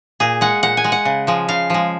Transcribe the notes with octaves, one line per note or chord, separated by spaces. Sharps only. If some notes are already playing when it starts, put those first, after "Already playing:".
A#2 G#4
G#3 F#5
A#2 F#5
G#5
G#3
F#5
C#3
F3 G#3
C#3 F5
F3 G#3